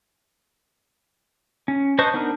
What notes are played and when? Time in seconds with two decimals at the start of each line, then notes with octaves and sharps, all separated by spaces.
1.68 C#4
1.99 B4 C5 D#5 A5 C#6
2.14 B3 D4 D#4 A#4